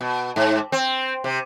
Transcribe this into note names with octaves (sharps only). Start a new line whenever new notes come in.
B2
G#2
C4
C3